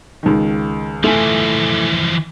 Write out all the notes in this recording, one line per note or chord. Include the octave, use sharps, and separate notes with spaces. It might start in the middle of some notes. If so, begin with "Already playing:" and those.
C#2 D#3
E3 F3 A3 G#5